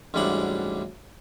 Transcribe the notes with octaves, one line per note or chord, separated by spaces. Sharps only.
A1 D2 G#2 G3 D4 F#5